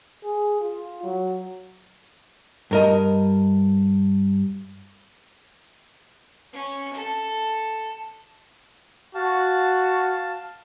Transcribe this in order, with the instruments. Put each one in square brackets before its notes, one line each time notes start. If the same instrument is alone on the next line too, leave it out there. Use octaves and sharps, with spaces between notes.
[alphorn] G#4
F4
F#3
[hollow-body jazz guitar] G2 A#4 D#5
[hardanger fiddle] C#4
A4
[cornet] F#4 [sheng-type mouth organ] F5 A5